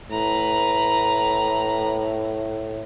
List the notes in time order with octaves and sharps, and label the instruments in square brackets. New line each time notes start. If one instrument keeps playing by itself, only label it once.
[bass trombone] A2 [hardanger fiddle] B4 A#5